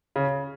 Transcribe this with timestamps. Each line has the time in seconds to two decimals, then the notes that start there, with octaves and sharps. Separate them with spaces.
0.16 C#3